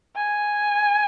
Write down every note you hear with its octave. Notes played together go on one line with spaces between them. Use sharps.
G#5